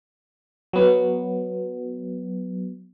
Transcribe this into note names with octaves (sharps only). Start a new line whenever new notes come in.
F#3 B3